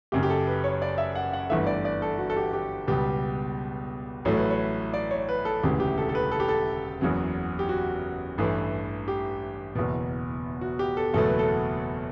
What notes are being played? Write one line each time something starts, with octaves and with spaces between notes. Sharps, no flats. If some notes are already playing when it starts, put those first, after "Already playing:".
F#1 F#2 C#3 G4
G4
A4
B4
C#5
D5
E5
F#5
F#5
G1 G2 E3 A3 E5
D5
D5
A4
F#4
A4
G4
G4
C#2 B2 G3 G4
A1 A2 F#3 A3 C#5
B4
C#5
D5
C#5
B4
A4
E1 D2 C#3 E3 G4
G4
A4
A4
B4
A4
G4
A4
F#1 E2 C#3 F#3
G4
F#4
A1 G2 E3 A3
G4
F#1 E2 B2
F#4
G4
A4
F#1 E2 B2 F#3 A3 A4
B4
A4